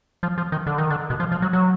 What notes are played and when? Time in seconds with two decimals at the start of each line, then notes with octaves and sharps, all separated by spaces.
0.23 F3
0.38 F3
0.52 D#3
0.67 D3
0.78 D#3
0.90 D3
1.10 B2
1.20 F3
1.32 F3
1.42 F#3
1.53 F#3